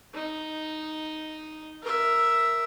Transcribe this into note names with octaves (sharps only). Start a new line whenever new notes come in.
D#4
A#4 E5